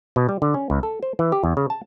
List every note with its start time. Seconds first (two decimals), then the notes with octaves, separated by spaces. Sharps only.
0.16 B2
0.29 G3
0.42 D3
0.54 C#4
0.70 C#2
0.83 A4
1.03 C5
1.19 E3
1.32 G4
1.44 E2
1.57 C#3
1.70 A5